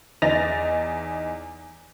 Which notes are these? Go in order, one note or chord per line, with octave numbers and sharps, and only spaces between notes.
E2 D#4 A6 A#6 F7